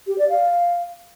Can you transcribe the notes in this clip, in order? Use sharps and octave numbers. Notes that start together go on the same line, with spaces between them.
G4
D5
F5